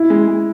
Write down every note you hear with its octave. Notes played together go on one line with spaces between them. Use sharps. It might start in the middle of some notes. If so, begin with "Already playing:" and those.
Already playing: E4
G#3
G#3